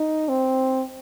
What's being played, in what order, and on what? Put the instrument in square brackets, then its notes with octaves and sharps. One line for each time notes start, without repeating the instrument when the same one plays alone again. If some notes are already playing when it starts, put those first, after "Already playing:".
Already playing: [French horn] D#4
C4